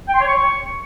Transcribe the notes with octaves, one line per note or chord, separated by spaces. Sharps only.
G5
C6
C#5
C#6